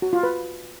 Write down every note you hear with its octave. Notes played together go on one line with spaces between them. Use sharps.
F#4
F4
B4